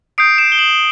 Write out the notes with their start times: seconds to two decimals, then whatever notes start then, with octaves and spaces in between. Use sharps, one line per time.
0.18 D#6 G6 C7 D7
0.38 D7 E7
0.52 G7
0.59 E7 F#7